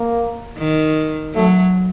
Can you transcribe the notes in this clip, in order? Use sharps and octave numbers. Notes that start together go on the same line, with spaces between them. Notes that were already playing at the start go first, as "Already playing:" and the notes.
Already playing: A#3
D#3
F#3 A3